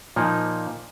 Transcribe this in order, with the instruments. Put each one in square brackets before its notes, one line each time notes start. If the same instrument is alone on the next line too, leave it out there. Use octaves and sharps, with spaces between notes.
[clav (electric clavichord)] A#2 F3 A#3 D#4